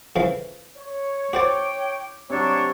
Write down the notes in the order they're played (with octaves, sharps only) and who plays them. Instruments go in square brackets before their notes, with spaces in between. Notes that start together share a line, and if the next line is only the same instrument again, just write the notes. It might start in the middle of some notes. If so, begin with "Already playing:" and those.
[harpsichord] F2 C#3 E3
[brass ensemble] C#5
[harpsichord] F#4 C5 D5 [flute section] G5 [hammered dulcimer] D6
[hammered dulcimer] C3 F#3 [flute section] D4 C#5 C#6